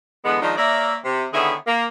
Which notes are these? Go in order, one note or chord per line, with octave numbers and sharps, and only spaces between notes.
D3 E3 G#3 B3
D#3 F3 G#3 D4 D#4
A#3 A#4 C#5 D5 E5
C3
D3 D#3 B3 E4 G#4 C#5
A#3